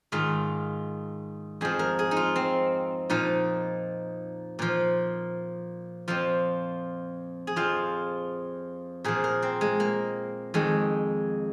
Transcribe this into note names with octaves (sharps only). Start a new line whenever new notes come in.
G#2 D#3 F4
F2 F3 G#4
A#4
G#4
D#4
F4
C4
A#2 F3 D#4
A#2 F3
F2 F3 F4
G#4
F2 F3 F4
A#2 F3 G#4
A#4
C4
G#3
A#3
F2 D#3 G#3